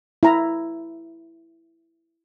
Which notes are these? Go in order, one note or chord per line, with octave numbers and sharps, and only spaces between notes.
E4 A#5